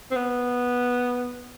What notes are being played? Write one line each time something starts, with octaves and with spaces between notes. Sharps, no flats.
C4
B3